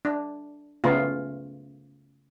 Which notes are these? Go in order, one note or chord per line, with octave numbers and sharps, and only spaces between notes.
D4
C#3 A3 B3 F4